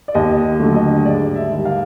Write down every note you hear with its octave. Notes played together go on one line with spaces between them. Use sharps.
D5
D#2 D#5
D3 F#3 A3
D#5
G#2 D5
E5
D#3 G3
F5